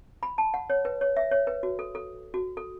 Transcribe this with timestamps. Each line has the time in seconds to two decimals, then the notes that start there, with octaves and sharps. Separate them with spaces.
0.23 B5
0.38 A5
0.54 F#5
0.70 C#5
0.85 B4
1.01 C#5
1.17 E5
1.31 C#5
1.47 B4
1.63 F#4
1.79 A4
1.95 A4
2.34 F#4
2.57 A4